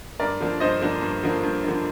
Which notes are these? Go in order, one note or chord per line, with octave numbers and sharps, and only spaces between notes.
G2 A#4 D5
D3 F3 A#3 D4
G2 C5 D#5
D3 F3 A#3 D4
G2
D3 F3 A#3 D4
G2
D3 F3 A#3 D4